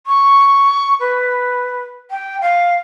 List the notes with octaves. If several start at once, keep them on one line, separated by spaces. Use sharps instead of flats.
C#6
B4
G5
F5